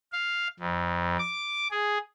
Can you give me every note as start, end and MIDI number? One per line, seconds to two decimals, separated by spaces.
0.13 0.48 77
0.60 1.17 41
1.19 1.68 86
1.71 1.98 68